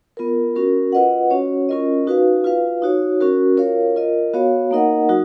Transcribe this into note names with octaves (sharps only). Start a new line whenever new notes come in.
B3 F4 A#4
C#4 F#4 A#4
F4 B4 D#5 F#5
C#4 F#4 C#5
C#4 F4 A#4 D#5
D#4 F#4 B4 F5
F4 B4 F5
D#4 F#4 C#5
C#4 F#4 A#4
F4 A#4 C#5 F5
F4 A#4 D#5
B3 F#4 C#5 F5
A#3 D#4 A#4 D#5 F#5
F#3 D#4 F#4